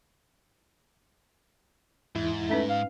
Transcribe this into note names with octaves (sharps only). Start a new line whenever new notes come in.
E2 G#2 E4
A3 C#4 D#4 B4
F5